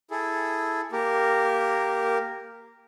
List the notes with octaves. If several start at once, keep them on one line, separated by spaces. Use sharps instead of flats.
E4 G#4 A4
A#3 G4 A#4